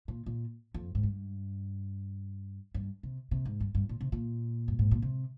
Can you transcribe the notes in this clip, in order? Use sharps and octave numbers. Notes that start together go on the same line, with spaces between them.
A#2
A#2
F2
G#2
G2
G2
C3
C3
G#2
G2
G2
A#2
C3
A#2
G2
G#2
A#2
C3